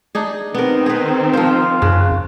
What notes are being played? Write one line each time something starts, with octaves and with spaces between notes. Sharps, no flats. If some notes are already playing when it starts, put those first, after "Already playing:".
D4 D#4 G#4
D#3 B3 C4 A#4
G#4 B4
F3 F4 C5
F#2 C#3